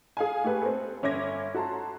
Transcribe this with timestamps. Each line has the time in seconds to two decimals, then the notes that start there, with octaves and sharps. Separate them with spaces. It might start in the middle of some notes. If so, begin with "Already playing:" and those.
0.17 G#4 F5 G#5
0.44 A3 G4 A4 B4
0.61 C4 A4
1.02 G1 C#4 E5 D6 G#6 A#6
1.54 F#4 A4 A5 A#5 C6